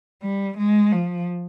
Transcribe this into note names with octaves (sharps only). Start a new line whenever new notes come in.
G3
G#3
F3